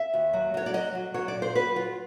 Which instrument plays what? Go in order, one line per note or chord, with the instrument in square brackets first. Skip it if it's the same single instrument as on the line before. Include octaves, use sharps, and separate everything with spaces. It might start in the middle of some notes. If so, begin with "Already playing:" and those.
Already playing: [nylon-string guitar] E5
D#2
F#3
F#3 C#5
D5
F#3 D#5
F#3
F#3 C#5
D5
A#2
C5
F#3 B4
F#3 F4